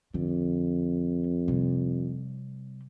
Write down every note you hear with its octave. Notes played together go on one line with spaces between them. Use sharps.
F2 D3
C3 G3